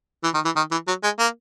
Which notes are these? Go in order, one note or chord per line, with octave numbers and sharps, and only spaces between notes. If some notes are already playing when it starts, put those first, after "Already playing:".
E3
D#3
E3
D#3
E3
F#3
G#3
A#3